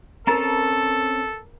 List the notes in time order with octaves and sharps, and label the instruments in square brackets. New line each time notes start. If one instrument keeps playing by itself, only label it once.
[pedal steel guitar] C4 C#4 A5 [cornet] A4 [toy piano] A#4 A#5